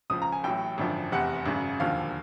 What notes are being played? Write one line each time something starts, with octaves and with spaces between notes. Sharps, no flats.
C#2 C#3 F3 D#6
A#5
G#5
A1 A2 F#3 G5
G#1 F#2 D3 F3
F1 E2 C3 F#5
G#1 F#2 C#3
E1 D#2 D3 F3 F5